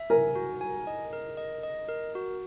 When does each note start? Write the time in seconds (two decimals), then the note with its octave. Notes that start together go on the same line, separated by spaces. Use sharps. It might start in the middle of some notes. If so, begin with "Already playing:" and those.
Already playing: E5
0.10 A#4 G#5
0.35 F#4
0.61 G#5
0.87 D#5
1.13 A#4
1.37 D#5
1.63 D#5
1.89 A#4
2.15 F#4